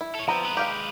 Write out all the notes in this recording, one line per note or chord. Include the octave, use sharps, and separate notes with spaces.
E4
A4 C#5
F3 B3 C4 A#5
G#3 B4
G4 F5 G5